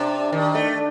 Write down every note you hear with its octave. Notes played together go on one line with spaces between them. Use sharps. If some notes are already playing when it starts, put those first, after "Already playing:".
Already playing: C3 D4
D#3
A3